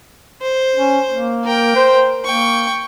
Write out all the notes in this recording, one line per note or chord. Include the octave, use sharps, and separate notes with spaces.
C5
C#4
A#3
A#4 G5
C5
A#3 G5 C#6